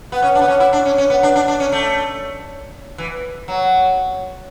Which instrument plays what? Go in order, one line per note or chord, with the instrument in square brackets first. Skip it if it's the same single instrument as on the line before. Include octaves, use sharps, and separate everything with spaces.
[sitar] B3
C#4
D4
B3
C#4
E4
D4
C#4
C#4
B3
D4
D4
D4
C#4
A3
E3
F#3